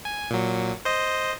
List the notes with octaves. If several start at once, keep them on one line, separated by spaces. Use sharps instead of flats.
G#5
A#2 F#3
C5 D#5